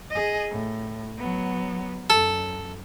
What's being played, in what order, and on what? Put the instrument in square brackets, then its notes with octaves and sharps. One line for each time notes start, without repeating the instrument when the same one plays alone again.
[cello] G#4 D#5
A2
F#3 B3
[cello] F#2 [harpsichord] A4